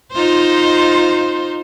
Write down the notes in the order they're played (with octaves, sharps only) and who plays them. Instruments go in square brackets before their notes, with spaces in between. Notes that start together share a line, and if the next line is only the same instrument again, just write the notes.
[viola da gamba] D#4 F4 C5